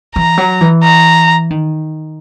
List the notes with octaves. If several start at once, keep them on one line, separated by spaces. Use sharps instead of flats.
E3 A#5
F#3
E3
A#5
D#3